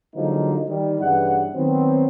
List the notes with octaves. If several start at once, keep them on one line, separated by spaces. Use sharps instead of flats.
D3 F3 F#3 G#3 A#3 D#4
D#3 G3
G2 C#3 E3 F#5
D#3 F#3 B3 C4